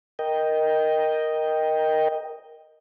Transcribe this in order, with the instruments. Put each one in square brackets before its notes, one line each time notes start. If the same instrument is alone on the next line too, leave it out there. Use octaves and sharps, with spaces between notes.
[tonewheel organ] A#4 D#5 G5